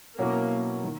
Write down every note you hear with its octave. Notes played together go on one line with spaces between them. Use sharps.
B2 F#3 A#3 C#4 E4 A#4
D#3